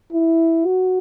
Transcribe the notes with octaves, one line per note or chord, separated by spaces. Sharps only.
E4
F#4